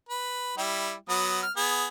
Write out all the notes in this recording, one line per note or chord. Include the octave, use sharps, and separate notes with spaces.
B4
G3 E4 G4
F#3 B3 D#6
F6
B3 G#4